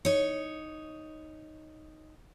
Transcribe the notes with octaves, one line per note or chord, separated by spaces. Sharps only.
D#4 C#5